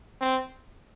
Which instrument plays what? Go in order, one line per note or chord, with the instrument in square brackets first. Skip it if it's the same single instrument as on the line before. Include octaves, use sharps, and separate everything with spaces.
[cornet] C4